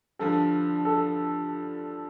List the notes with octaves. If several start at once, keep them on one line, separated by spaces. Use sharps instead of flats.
G2 D3 F3 A4
A4